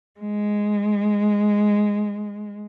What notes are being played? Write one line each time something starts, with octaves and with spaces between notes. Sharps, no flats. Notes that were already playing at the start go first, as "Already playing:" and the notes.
G#3